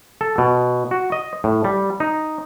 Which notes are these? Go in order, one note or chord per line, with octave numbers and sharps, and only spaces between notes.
A4
B2
F#4
D#5
A2
G3
D#4